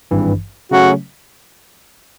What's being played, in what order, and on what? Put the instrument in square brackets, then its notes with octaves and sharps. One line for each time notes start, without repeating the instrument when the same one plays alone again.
[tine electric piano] G#1 G2 E3
[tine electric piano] C#3 F#3 A3 C#4 [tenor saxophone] F#4